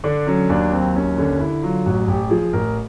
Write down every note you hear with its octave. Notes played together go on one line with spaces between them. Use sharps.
D3 D4
F#3 C#4
D#2 D4
F#3 C4
D#2 C#4
D3 C#4
D3 E4
F#3 F4
A1 F#4
A1 G4
F3 G#4
A1 A#4